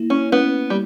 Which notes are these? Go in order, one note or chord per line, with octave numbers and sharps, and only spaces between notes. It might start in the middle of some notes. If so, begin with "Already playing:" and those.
Already playing: A#3 E4
C#4
B3 C#4
G3